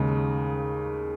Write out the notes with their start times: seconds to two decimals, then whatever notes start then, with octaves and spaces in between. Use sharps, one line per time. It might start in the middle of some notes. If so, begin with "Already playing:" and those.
Already playing: D#2 C#3 G#3 D#4